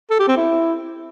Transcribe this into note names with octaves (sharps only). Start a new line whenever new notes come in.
A4
G4
C4
E4